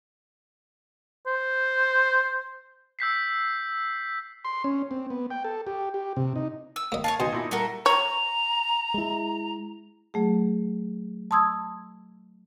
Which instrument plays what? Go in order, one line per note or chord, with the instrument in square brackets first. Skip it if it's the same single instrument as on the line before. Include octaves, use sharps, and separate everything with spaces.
[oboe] C5
[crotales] E6 G6 B6 C7
[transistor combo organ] C6
C#4
C4
B3
G5
A4
G4
G4
C3
D#4
[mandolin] E6
[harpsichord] A#3 D#5
[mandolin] C#5 F#5 A5 [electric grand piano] F5 C7
[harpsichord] B2 [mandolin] D#4 [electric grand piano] D#5 G#5 C6
[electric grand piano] A#2 E4 A#6
[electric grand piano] G3 F#5 [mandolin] A3 A4 A#4
[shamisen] C#5 [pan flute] A#5
[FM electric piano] G#3 E4
[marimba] F#3 A3 G#4
A5 C6 D#6 E6 G#6